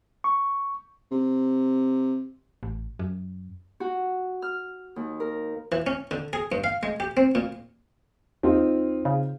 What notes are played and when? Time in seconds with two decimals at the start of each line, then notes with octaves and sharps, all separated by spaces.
0.24 C#6
1.11 C3
2.63 A1
2.99 F#2
3.80 F#4
4.42 F6
4.96 D#2
5.20 A#4
5.72 E3
5.87 C#4
6.11 D3
6.33 G#4
6.52 G2
6.64 F5
6.83 G#3
7.00 G4
7.17 C4
7.35 A#2
8.43 D#2 C4 D#4 F4
9.05 C#3